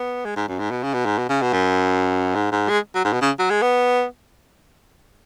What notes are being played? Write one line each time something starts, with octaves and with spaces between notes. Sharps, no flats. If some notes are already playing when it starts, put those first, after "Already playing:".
Already playing: B3
G#3
G#2
F#2
G#2
B2
C#3
B2
G#2
B2
C#3
B2
F#2
G#2
G#2
G#3
F#3
G#2
B2
C#3
F#3
G#3
B3